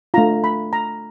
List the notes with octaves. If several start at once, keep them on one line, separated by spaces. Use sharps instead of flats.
A3 D4 F4 A#5
B5
A#5